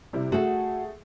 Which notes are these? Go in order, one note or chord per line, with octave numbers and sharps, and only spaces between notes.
C3 G3 E4
A3 F#4 G#4 A4